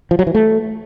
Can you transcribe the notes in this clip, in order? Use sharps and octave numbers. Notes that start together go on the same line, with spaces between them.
F3
F#3
E3
A3